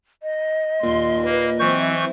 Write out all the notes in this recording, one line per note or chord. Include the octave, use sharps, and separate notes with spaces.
D#5
D#2 A#2 C6
A#3 B4
E3 F#3 C4 E4 C#6 G6